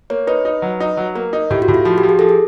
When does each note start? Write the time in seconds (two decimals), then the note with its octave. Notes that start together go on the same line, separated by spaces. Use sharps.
0.10 A#3 C#5
0.27 D#4 B4
0.45 D#4
0.62 F#3
0.80 D#4
0.97 F#3
1.15 A#3 A#4
1.33 D#4
1.50 A2 G4
1.62 F#4
1.68 A2
1.74 F4
1.85 F3 F#4
1.98 G4
2.03 F3
2.09 G#4
2.19 F3 A4
2.29 G#4